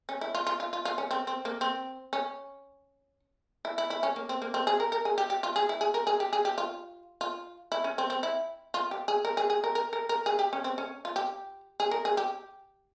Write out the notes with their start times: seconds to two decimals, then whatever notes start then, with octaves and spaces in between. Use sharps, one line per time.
0.09 C#4
0.21 E4
0.35 F4
0.47 F4
0.60 F4
0.73 F4
0.85 F4
0.98 C#4
1.11 C4
1.27 C4
1.45 A#3
1.61 C4
2.13 C#4
3.65 E4
3.78 E4
3.90 E4
4.03 C#4
4.16 A#3
4.29 C4
4.42 A#3
4.54 C4
4.67 G#4
4.80 A#4
4.92 A#4
5.05 G#4
5.18 G4
5.30 G4
5.43 F4
5.56 G#4
5.69 E4
5.81 G#4
5.94 A#4
6.07 G#4
6.20 G4
6.33 G#4
6.45 G4
6.58 F4
7.21 F4
7.72 E4
7.84 C#4
7.98 C4
8.10 C4
8.23 E4
8.74 F4
8.91 G4
9.08 G#4
9.25 A#4
9.37 G#4
9.50 G#4
9.64 A#4
9.75 A#4
9.93 A#4
10.09 A#4
10.26 G#4
10.39 G4
10.53 C#4
10.64 C4
10.78 C#4
11.05 F4
11.16 G4
11.80 G#4
11.91 A#4
12.05 G#4
12.17 G4